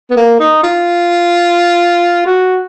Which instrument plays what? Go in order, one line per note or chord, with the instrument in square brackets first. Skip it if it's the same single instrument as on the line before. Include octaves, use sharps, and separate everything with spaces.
[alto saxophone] B3
A#3
D#4
F4
F#4